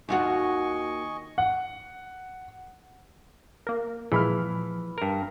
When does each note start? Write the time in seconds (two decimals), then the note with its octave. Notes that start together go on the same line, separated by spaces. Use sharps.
0.09 D#2 F4 F#4 D#5 G#5 C#6
1.38 F#5
3.67 A#3 A#4
4.12 G1 A#2 E3 F3 G#3 B5 F6
4.98 G2 A#4